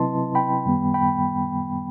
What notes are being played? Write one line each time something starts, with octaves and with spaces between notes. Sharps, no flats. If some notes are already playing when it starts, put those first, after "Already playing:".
Already playing: C3 F#3 C4 E4 B4 D#5 A5 C6
G5 B5
F#2 D#3 G3 B3
G5 B5